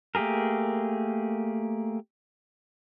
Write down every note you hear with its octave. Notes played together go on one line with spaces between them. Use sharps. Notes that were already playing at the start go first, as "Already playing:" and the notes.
A3 A#3 G4 G#4 A#4